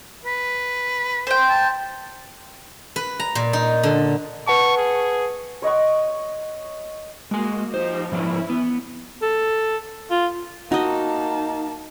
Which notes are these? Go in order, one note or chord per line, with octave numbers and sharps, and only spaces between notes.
B4
C5 G5
A5
B4
A#5
A#2
D#4
D3
B4 F#5 A5 C#6
G#4
C#5 D#5 F#5 C#6
G#3 A#3 F#4 G#5
F3 D#4 G4 C5
G#2 E3 F3 C#4 E4 D5
B3
A4
F4
A#3 D#4 F#4 D#5 A5